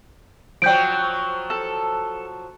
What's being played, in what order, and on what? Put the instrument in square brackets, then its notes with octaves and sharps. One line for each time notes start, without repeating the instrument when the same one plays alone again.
[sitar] F3 F#3 [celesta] G5 G6 D7
[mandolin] A4